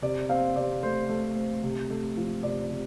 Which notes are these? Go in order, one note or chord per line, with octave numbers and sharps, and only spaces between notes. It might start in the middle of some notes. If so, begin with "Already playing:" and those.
C3 D5
C4 F5
C3 D5
A3 C5
A3
C4
C3
A3
F3
C3 D5
C3